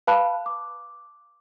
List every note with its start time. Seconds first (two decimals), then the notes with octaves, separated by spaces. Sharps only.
0.07 B4 F5 A5 B5 F#6
0.46 D6